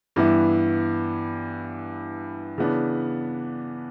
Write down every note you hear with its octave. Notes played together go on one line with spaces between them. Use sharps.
G2 E3 B3 E4
C#3 E3 B3 D4